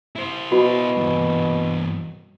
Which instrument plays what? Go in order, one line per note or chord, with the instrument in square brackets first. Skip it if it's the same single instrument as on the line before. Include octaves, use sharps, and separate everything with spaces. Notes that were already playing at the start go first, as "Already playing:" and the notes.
[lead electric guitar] E4 C5
[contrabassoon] B2 [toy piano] F#4
[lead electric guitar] G2 E3